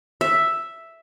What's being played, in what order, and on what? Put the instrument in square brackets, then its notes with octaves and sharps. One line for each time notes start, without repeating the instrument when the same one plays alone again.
[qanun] E5